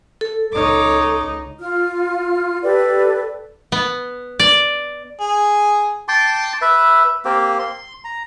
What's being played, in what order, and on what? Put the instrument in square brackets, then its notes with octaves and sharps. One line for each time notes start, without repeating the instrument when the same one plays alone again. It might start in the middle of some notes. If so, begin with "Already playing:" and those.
[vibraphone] A4
[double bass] C#2 D#4 [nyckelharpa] C#5 D6
[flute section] F4 F6
G4 A4 B4 D5
[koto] B3
D5
[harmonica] G#4
[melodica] G5 A5 C6 D6
B4 E5
A#3 C4 G4
C6
A#5